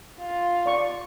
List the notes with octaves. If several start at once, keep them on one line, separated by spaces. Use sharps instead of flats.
F4
D5 C#6